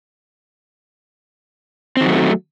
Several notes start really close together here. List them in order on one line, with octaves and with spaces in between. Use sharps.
C4 D#3 F#3 A3